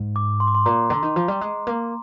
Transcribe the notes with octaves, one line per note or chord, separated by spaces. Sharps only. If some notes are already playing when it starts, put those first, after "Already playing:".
Already playing: G#2
D6
C6
D6
C6
A#2 A#5
D3
D#3
F3
G3
G#3
A#3